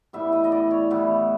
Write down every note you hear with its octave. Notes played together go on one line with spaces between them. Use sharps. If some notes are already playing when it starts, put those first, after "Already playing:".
A2 E3 G3 B3 E5
D#5
D#5
D5
C#5
A2 E3 G3 B3